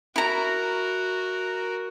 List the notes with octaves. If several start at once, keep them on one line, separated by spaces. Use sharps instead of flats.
E4 F#4 A#4 A#5